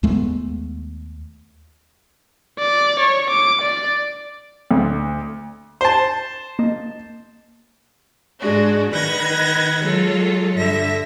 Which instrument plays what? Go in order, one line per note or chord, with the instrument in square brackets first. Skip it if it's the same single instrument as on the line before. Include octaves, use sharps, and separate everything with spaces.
[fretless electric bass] D#2 G#3 A3 B3
[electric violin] D5
C#5
D6
D5
[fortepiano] D2
C5 A5
[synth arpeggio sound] A#3 D#5
[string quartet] G#2 G#3 D4 F#4
D#3 B4 F#5 G#6 A#6
F#3 G#3 F4 A4
G2 D3 E5 A#6